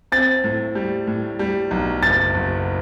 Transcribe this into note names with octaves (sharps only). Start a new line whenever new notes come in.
C4 A6
A2
G3
A2
G3
B1
F#1 A6
F#1